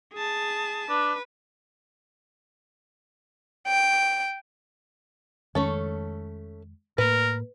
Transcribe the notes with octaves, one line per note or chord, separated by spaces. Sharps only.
G#4 A5
D4 B4
G5
F2 D#3 G#3 A3 C#4 A4
A2 A#3 A#4 B4